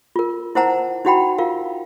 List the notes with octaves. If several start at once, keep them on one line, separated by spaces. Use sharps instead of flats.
F4 A#4
E4 A#4 C5 F#5 A5 A#5
D#4 E4 F#4 F#5 G5 B5
F4 A#4 F5